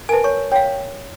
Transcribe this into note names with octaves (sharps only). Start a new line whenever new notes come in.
A#4 B4 G#5 A5
C#5 C#6
C#5 F5 G5